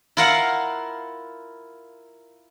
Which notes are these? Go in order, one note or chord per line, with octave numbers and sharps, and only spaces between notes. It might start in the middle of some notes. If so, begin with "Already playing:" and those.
E4 F4 A#4 F5 F#5